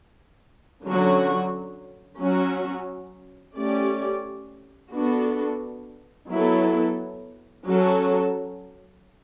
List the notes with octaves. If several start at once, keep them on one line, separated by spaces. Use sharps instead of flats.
D3 F#3 C#4 F#4
F#3 C#4 F#4
A3 C#4 G4 D5
B3 D4 F#4 A4
F#3 B3 E4 A4
F#3 C#4 F#4 A4